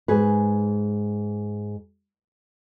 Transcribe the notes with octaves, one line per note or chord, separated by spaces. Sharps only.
G#2 G#4 B4